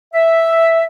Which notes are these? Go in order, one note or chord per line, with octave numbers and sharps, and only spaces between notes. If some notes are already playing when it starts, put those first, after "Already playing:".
E5